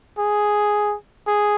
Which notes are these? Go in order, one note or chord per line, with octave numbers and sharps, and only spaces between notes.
G#4
G#4